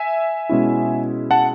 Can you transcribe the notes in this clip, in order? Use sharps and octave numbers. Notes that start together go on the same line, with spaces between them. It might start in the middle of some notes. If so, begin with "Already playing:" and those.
Already playing: E5 G#5
B2 G#3 C#4 E4
F#5 A5